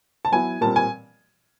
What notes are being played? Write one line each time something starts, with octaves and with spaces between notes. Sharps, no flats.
A5
F#3 B3 E4 G#5
A#2 G3 C4 A5
G#5